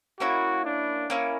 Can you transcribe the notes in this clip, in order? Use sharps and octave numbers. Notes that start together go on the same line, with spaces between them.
A#3 C#4 E4 F#4
D4
A#3 C#4 E4